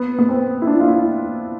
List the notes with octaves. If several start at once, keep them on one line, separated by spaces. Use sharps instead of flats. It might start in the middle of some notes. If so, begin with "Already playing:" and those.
Already playing: B3
B3
C4
E4
D4
F4
E4